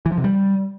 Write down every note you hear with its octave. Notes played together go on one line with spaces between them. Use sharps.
E3
F3
C3
G3